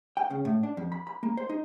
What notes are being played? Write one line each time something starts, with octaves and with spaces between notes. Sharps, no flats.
G5
C#3
A2
D4
F2
B5
B5
A#3
C5
D#4